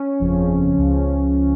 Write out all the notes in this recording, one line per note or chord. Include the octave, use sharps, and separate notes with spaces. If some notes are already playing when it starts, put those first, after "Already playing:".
Already playing: C#4
G1 F2 C#3 F3
C#2 C#3 F3